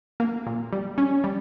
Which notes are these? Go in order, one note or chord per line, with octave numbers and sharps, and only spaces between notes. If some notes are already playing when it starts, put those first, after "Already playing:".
A#3
A#2
G3
C#4
G3